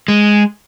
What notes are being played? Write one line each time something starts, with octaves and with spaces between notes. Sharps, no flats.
G#3